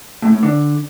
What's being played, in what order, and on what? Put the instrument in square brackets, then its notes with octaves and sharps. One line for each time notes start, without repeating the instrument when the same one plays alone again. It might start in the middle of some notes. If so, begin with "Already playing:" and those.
[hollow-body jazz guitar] A2
A2
D3